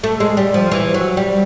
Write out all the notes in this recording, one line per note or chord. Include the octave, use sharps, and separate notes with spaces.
A3
G#3
G3
F3
E3
F#3
G3